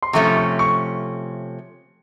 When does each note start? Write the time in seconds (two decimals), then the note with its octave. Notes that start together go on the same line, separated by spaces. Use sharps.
0.03 C6
0.13 C3 F3 A3 C#4 C#6
0.36 C#6
0.59 C#6